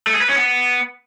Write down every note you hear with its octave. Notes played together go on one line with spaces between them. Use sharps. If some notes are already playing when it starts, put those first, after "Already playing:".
A3
G#4
B4
C#4
B3